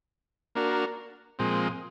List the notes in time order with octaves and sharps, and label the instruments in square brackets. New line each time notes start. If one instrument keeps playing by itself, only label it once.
[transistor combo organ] A#3 D4 F#4 A#4
A#2 F3 G#3 C4